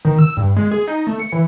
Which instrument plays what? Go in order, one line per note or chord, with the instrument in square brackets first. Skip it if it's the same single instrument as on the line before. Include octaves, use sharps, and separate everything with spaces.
[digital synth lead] D#3
E6
G2
G#3
G#4
D#4
A3
C#7
E3